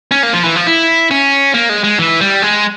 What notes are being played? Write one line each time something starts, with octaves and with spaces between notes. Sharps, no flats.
C#4
A#3
F3
E3
F3
E4
C#4
A#3
G#3
G#3
E3
G3
G#3